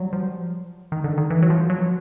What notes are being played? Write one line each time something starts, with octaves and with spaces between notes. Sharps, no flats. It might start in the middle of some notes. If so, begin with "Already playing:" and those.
Already playing: F#3 G3
F3
D#3
D3
D#3
E3
F#3
F3
F#3